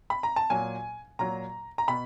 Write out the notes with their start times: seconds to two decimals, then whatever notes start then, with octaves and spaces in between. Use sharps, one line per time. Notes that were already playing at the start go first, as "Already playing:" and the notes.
0.10 B5
0.23 A#5
0.36 A5
0.50 A#2 F#3 G#5
1.19 A#2 F#3 A#5
1.78 A#5
1.88 B2 B5